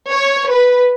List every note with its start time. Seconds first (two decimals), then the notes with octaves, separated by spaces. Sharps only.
0.11 C#5
0.52 B4